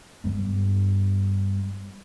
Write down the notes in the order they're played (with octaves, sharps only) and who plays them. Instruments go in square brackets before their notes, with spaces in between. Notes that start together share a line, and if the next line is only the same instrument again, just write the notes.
[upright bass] G2 B3